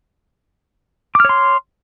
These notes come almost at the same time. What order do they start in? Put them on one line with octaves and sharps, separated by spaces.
D6 F6 C#5 C6